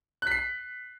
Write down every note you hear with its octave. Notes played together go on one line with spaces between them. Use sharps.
F#6 B6 C7